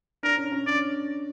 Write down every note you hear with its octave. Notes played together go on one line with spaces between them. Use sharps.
D4 A#4
C#4
C#4
D4 D5